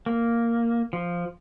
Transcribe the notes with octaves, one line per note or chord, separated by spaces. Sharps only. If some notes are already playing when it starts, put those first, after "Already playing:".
A#3
F3